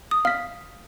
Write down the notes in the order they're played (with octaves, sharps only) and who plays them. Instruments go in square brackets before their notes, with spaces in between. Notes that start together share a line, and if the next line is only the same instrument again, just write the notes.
[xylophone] D#6
[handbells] F5 B6 [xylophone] F6